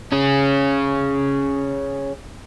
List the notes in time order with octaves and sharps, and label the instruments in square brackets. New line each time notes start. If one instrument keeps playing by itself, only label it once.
[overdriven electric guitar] C#4 G#4